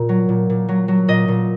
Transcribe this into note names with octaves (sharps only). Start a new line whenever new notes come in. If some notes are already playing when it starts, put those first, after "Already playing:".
Already playing: A#2
F#3
A#2
A#2
F#3
F#3
A#2 D#5
A#2